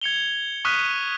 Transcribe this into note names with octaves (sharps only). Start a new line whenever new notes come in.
G#6 C#7 F7 G7
C#6 D#6 F6 F#6 B6 D#7